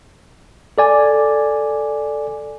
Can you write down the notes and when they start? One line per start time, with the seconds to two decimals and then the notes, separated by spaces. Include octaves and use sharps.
0.78 A4 D5 G#5